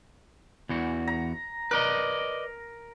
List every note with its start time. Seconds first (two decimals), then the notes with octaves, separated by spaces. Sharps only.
0.69 E2 E3 F#4
1.07 A#5
1.71 A#4 B4 D5 D#5